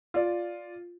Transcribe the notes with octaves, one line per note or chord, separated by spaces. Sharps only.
F4 D5